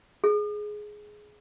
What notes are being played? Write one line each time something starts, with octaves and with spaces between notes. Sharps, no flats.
G#4